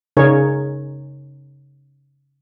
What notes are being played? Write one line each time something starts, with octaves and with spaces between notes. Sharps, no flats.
C#3 D#4 G#4 A#4 C#5